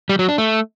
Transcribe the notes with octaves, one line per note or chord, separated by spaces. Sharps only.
G3
F#3
D4
A3